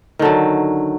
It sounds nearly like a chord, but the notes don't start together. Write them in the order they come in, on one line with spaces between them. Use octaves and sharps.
D#3 D3 F#3